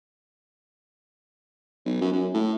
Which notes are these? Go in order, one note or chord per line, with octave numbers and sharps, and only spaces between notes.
B1
F#2
F#2
A2